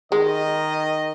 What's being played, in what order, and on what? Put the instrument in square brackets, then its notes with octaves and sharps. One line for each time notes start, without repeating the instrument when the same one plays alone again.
[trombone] D#3 [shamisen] G#3 [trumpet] D#5